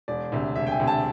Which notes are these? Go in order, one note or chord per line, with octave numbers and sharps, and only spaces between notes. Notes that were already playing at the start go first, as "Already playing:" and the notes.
E1 D5
D2 C3
E1 E5
G5
G#5
D2 C3
A5